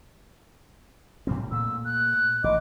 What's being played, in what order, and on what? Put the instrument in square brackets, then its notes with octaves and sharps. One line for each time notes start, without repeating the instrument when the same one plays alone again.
[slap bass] A2 G3 C4
[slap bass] A#2 A3 [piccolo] E6
[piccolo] F#6
[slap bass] A1 [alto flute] D#5 [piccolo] D6